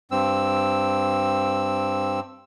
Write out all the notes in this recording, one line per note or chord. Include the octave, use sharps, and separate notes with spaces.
G2 C4 E6